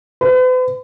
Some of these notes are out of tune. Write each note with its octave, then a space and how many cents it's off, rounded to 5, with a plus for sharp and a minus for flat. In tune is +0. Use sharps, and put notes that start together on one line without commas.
B4 +45